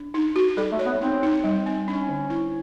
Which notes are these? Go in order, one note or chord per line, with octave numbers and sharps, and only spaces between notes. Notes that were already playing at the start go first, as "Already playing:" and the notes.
Already playing: D4
D#4
F#4
G3 A4
A3
C#5
B3
C4 D#4
D#4
G3
C4
C#4 D4
D3
E4